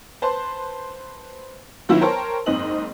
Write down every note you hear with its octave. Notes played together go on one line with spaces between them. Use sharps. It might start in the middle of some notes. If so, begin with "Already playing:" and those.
B4 C5 A5 C6
D#3 F#3 B3 E4 F4
A#4 C5 C#5 G5 A5
F#1 G#2 C4 D#5 F#7